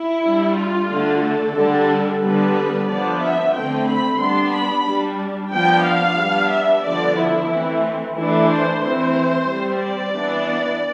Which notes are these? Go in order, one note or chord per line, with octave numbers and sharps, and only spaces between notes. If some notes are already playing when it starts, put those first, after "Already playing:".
Already playing: E4
G3 D4
F4
D3 A3 D4
A4
D3 G3 D4
D3 G3 B3 D4 B4
F3 B3 D4 D5
E5
D3 A3 C4 G5
B5
G3 B3 D4 C6
B5
G3 D4
F3 B3 D4 G5
F5
G3 B3 D4
E5
D3 F3 B3 D4 D5
E4
E3 A3 C4
E3 A3 D4 E4
C5
E3 A3 C4 C5
G3 C4
D5
E3 B3 D4